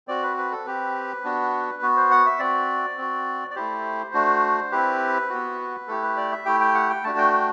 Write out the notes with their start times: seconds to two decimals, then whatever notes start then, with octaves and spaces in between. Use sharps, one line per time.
0.08 C4 F#4 D5
0.23 B4
0.37 B4
0.51 A4
0.65 C4 G4 B4
1.24 B3 D4 F#4
1.82 B3 F#4
1.97 C5
2.11 F#5
2.26 E5
2.39 C4 F#4 D5
2.98 C4 F#4
3.50 D5
3.56 A3 E4 G4 C5
4.14 A3 D4 F#4
4.71 C4 E4 G4 B4
5.30 B3 F#4
5.88 A3 E4 G4 A4
6.03 B4
6.17 D5
6.32 E5
6.45 A3 E4 G4 G5
6.60 G5
6.75 F#5
6.89 G5
7.04 A3 D4 F#4 A5
7.18 G5
7.33 G5